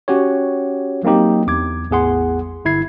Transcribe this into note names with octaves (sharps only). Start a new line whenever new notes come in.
C#4 F#4 G4 C#5
F#3 A#3 C4 D#4 G4
E2 D6 G#6
A1 E2 G#4 F#5 C6
G1 E4 G#6 C7